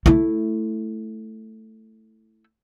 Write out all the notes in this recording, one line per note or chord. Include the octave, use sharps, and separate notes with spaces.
A3 E4